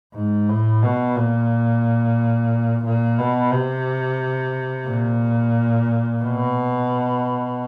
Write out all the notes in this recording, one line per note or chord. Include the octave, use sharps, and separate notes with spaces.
G#2
A2
B2
A#2
A#2
B2
C3
A#2
B2